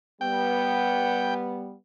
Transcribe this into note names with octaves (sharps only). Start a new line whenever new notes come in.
G3 B3 G5